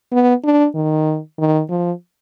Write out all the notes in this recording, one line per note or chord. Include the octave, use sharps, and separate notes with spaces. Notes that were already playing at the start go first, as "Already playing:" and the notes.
B3
D4
D#3
D#3
F3